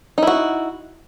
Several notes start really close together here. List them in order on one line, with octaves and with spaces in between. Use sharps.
D#4 E4 F#4